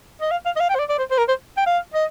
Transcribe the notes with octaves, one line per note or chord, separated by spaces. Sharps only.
D#5
F5
F5
D#5
F5
G5
C5
D5
D5
C5
C5
A#4
C5
G5
F5
D#5